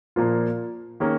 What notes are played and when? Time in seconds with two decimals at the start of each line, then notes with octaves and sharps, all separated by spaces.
0.16 A#2 F3 A#3 F4
1.00 D#3 A#3 C#4 G#4